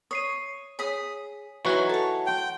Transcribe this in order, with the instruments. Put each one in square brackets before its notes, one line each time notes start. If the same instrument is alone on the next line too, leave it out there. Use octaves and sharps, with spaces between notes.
[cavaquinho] C#5 [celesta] D#6 C7 D#7
[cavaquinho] G#4 D#6 [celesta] C#5 B6
[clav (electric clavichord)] E3 F#3 F#4 [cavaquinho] D#4 C#6
[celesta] A4 [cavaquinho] C#5 A5
[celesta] F#5 C6 [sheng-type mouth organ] G5